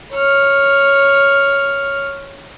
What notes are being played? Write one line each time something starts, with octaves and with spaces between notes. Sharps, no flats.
C#5 F6